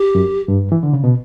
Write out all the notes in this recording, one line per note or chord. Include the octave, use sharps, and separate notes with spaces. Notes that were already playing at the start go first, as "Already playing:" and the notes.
Already playing: G4
F#2
G2
E3
D3
C#3
B2